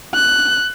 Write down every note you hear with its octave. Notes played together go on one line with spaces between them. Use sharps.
F#6